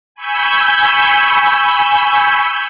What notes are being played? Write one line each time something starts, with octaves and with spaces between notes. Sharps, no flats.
G#5 B5 C#6 E6 G6